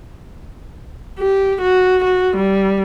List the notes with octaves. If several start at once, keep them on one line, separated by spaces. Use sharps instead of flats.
G4
F#4
F#4
G3